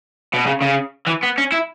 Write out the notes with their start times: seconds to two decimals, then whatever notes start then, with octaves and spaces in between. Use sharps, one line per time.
0.34 B2
0.47 C#3
0.62 C#3
1.07 E3
1.23 B3
1.38 C#4
1.52 E4